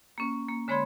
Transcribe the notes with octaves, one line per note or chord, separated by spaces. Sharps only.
A#3 C#4
A#3
D3 G#3 C#5 B5 C6 G#6